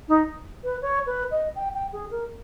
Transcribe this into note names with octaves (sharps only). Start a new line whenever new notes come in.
D#4
B4
C#5
B4
D#5
G5
G5
G#4
A#4